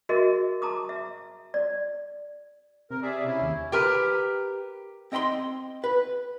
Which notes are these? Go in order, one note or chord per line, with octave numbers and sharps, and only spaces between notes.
F#4 G#4 A#4 D#5 E5
A5 A#5 D6 D#6
E5
D5
C3 A#4
G#4 D5 E5
C#4 E4
D#2
G4 A#4 B4
C4 D#5 G5 B5 C6
B4